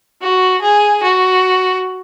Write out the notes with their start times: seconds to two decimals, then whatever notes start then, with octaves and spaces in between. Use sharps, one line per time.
0.21 F#4
0.62 G#4
1.03 F#4